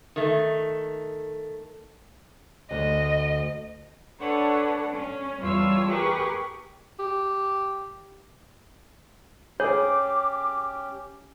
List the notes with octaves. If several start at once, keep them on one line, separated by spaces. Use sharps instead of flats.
D#3 A3
D2 D#5
D4 A4 B4 C#5 F#5
C#4
E2 G3 F4 C#5 A5 E6
G4 G#4 A#4 B4 C#6
G4
C#4 G4 G#4 C#5 D6